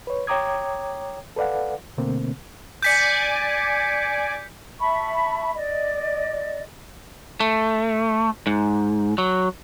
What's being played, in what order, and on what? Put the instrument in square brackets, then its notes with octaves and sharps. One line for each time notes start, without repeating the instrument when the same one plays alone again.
[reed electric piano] B4 C#5
C#5 G5 A#5 D6 D#6 G#6
A4 B4 D5 F5 F#5
B2 D3 A3 A#3 C4
[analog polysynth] D5 G#5 D6 [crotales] G6 B6 C#7
[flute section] E5 A5 B5 C#6
D5 D#5
[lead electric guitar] A3
G#2
F#3